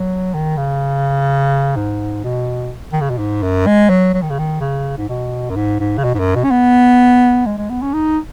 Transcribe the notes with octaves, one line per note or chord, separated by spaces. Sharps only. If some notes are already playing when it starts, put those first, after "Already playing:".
Already playing: F#3
D#3
C#3
G#2
B2
D#3
C#3
B2
G#2
F#2
G#3
F#3
F#3
D#3
C#3
D#3
C#3
G#2
B2
F#2
G#2
G#2
C#3
B2
G#2
F#2
B2
C#4
B3
G#3
G#3
B3
C#4
D#4